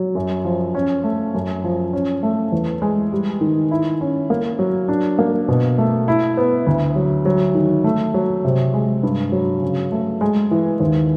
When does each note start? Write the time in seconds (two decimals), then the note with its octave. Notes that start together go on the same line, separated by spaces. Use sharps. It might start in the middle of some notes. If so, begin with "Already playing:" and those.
Already playing: F#3
0.15 F#2
0.45 F3
0.75 C#4
1.04 A3
1.35 F#2
1.64 F3
1.93 C#4
2.23 A3
2.52 E2
2.82 G#3
3.12 G3
3.41 D#3
3.71 E4
4.01 C#4
4.30 A#3
4.59 F#3
4.88 D4
5.19 A#3
5.48 B2
5.78 A3
6.08 E4
6.37 B3
6.67 D2
6.96 F#3
7.26 F#3
7.55 D#3
7.84 A3
8.14 F#3
8.45 C3
8.74 G#3
9.03 G2
9.32 F#3
9.62 C#3
9.92 A3
10.21 G#3
10.51 E3
10.80 D#2